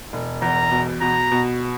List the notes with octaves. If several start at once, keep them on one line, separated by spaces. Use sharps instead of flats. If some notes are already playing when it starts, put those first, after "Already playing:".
E1
E2 A#5
B2
B2 A#5
B2